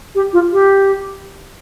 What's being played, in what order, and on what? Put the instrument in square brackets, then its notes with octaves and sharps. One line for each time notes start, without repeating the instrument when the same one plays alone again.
[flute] G4
F4
G4